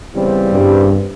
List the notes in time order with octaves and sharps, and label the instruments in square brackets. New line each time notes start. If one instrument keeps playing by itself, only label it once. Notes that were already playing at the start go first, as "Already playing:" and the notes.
[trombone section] E2 C#3 E3 G3 C4
[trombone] G2